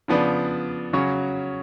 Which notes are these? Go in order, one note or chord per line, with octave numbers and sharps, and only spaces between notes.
C#3 F3 B3 D4
C#3 F#3 C#4 F#4 C#5